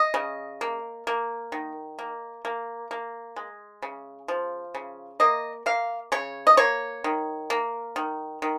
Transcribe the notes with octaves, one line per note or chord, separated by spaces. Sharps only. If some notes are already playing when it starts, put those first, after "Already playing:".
Already playing: D#5
C#3
A#3
A#3
D#3
A#3
A#3
A#3
G#3
C#3
F3
C#3
A#3 D#5
A#3 F5
C#3 C#5
D#5
A#3 C#5
D#3
A#3
D#3
D#3